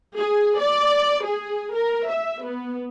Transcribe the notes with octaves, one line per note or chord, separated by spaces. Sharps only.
G#4
D5
G#4
A#4
E5
B3